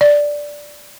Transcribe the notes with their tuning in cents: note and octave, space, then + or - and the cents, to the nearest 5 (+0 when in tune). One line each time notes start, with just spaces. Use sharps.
D5 -5